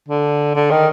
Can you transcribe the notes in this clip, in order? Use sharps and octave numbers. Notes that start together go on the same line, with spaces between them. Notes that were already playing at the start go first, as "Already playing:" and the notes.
D3
D3
D#3